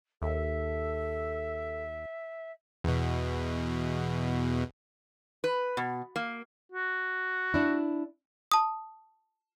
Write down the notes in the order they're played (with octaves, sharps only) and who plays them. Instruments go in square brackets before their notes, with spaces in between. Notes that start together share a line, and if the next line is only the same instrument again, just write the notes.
[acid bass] D#2 [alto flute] A4 [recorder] E5
[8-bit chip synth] E2 B2
[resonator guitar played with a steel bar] B4
B2
A#3
[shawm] F#4
[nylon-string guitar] D4 E4
[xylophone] A5 D#6